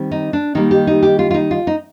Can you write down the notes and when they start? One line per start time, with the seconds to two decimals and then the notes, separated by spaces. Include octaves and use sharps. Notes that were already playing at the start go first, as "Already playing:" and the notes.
Already playing: D#3 G3 C4
0.11 D#4
0.33 D4
0.55 D#3 G3 A#3 D#4
0.71 G4
0.87 D#4
1.03 G4
1.19 F4
1.31 F4
1.34 D#4
1.51 F4
1.67 D#4